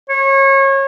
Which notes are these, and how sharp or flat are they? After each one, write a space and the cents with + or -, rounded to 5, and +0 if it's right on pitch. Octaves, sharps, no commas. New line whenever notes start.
C#5 -30